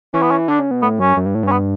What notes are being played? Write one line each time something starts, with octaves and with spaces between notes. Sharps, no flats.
E3 C#4
B3
C#4
D3 D4
C#3
B2
A2 B3
F#2 C#4
F#2
G2
A2
G2 C#4
B3